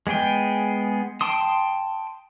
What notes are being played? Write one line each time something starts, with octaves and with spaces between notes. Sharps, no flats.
G#3 B3 G#4 G5
G5 A5 C6 D#6